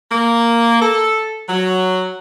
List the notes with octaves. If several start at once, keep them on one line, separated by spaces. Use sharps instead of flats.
A#3
A4
F#3